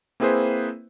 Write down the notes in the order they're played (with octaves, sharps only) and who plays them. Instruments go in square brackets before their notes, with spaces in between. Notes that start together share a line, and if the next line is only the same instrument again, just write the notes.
[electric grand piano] A#3 C4 E4 G#4 B4 C5